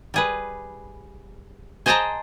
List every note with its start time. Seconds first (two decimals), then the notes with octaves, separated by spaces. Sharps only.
0.14 G3 G#4 B4
1.86 G#4 C5 D#5 G5 A5 A#5